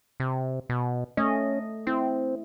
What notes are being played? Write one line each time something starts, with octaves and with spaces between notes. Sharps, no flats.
C3
B2
A3 C#4 D#5
C4 E4